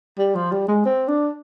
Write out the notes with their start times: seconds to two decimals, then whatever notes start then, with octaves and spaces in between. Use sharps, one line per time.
0.18 G3
0.35 F3
0.52 G3
0.68 G#3
0.85 C4
1.08 D4